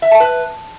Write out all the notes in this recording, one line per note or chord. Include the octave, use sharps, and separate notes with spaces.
E5
A5
B4